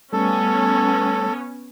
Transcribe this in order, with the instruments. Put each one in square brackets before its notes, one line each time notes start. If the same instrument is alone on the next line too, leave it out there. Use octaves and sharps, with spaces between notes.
[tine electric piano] G3 A3 [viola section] B3 C#4 [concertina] A4